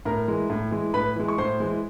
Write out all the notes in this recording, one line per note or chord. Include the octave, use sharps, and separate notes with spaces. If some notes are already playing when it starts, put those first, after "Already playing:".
A2 A#4 A#5
E3 G#3
A2
E3 G#3
A2 B4 B5
E3 G#3
C#6
A2 C5 C6
E3 G#3